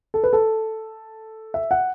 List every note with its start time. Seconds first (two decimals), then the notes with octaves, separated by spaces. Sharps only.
0.14 A4
0.24 B4
0.33 A4
1.54 E5
1.71 F#5